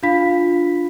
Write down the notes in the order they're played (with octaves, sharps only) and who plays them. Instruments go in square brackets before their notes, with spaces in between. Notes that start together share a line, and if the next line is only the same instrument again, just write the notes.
[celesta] D4 F4 F5 B5 B6